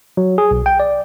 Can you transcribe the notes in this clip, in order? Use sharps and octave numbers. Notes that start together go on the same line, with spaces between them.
F#3
G#4
B1
G5
D5